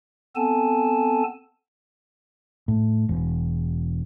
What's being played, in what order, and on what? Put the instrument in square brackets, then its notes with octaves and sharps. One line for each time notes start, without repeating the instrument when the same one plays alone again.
[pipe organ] B3 C4 A4 G#5 A5
[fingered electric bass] A2
E1